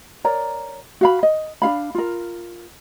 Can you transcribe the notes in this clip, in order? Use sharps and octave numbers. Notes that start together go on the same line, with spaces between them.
A#4 C#5 D5 A#5
F#4 F5 B5
D#5
D4 F4 F5 B5
F4 A#4